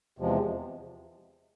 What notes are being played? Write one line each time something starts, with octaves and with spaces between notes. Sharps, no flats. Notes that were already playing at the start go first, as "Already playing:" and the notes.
E2 C3 F3 G#3